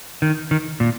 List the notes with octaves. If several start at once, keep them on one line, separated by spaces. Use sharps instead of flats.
D#3
D#3
A#2